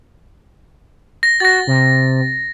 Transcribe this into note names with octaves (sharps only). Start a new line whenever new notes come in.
A#6
F#4 A6 A#6
C3